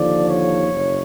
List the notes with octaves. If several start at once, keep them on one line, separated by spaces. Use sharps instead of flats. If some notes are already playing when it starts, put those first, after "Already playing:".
Already playing: D#2 D3 F3 D5
C#5
F#1